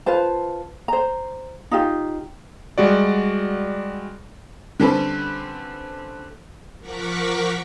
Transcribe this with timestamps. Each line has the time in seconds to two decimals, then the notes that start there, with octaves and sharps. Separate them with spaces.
0.06 F4 B4 C5 A5
0.88 C5 A#5
1.71 D#4 F4 G4
2.78 G3 G#3 F#4 D5
4.80 D3 G3 C4 C#4 A4 B4
6.79 F3 A#4 F#5 C#6 D6 B6